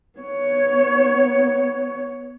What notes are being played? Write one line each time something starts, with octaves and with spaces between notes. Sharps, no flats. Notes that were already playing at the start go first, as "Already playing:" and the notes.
B3 C#5